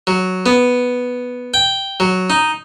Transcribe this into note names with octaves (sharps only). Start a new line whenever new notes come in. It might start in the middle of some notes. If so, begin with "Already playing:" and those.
F#3
B3
G5
F#3
D#4